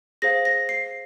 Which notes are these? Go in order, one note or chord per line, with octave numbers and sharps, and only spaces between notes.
G#4 C5 F5 A#6
A#6
C7